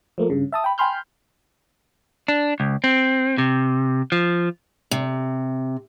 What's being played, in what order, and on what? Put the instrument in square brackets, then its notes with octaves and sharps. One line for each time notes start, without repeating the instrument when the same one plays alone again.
[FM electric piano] F3 A3 A#3
G2 C#3
E5 A5 D#6
G5 B5
G5 G#5 B5 C6 F6 G6
[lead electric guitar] D4
C#2
C4
C3
F3
[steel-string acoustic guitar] C3